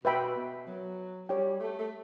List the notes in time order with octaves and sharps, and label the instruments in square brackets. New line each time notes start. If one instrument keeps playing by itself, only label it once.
[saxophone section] B2 [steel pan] B4 E5 G5 B5
[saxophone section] B2
F#3
[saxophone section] G3 [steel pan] G4 C#5 G5
[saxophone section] A3
A3